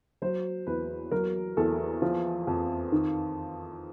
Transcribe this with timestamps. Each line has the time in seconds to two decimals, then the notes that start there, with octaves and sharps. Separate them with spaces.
0.22 F#3 C5
0.67 E2 B4
1.11 F#3 A#4
1.57 E2 A4
2.02 F3
2.47 F2
2.92 D#3